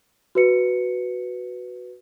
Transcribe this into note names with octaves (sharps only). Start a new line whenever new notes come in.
F#4 B4 C#7